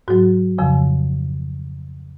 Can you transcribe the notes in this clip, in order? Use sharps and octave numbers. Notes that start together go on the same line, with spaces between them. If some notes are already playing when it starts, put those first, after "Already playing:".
G#2 F#3 F#4
F2 C#3 F3